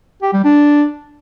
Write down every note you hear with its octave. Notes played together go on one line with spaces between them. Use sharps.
G4
G3
D4